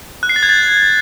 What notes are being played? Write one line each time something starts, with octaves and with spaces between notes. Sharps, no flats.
F#6
C7
A6
G#6
A6